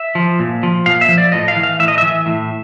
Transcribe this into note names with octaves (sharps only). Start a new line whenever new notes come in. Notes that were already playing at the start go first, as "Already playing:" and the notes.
Already playing: E5
F3
A#2
F3
A#2 F5
E5
F3
D5
A2 D#5
F5
E3
F5
A2 E5
D#5
E3 E5
A2